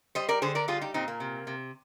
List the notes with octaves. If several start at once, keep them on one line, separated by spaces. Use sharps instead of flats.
G3 C5 D#5
A#4 D5
D3 G#4 C5
A#4 D5
G3 F4 G#4
D#4 G4
A#2 C4 D#4
A#3
C3
C3